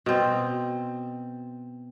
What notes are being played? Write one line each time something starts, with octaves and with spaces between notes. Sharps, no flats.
B2 C4